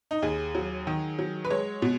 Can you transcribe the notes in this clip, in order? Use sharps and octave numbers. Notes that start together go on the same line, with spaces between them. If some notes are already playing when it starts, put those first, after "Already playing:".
D#4
D#2 G#4
F#3
D#3
F#3
B4
G#3 C#5
B2